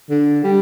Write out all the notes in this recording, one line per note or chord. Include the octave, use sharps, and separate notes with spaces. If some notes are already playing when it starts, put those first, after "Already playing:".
D3
G3